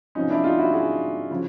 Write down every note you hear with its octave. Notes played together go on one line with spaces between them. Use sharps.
C3 F3 C#4 D#4
D4 E4
D#4 F4
E4 F#4
F#4 G#4
C#3 F3